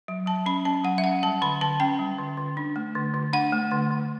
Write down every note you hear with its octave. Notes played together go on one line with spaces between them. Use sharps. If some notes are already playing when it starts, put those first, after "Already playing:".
F#3
F#3 A5
C#4 B5
C#4 A5
F#3 F#5
E5
C#4 F#5
G3 A5
D3 B5
D3 A5
C#4 G5
G3
D3
D3
D4
A3
D3
D3
D4 F#5
A3
D3
D3